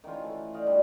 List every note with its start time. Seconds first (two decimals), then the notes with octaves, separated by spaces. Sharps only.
0.04 D#3 E3 C#4 F4
0.24 A3
0.54 D5 D#5 F5 G5
0.67 G3 D4 F#4